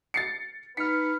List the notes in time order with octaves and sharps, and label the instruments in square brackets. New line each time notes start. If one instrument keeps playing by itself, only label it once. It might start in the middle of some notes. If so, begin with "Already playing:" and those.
[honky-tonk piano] A6 C7 C#7
[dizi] D#4 [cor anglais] B4 [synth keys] F6 C#7 [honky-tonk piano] B6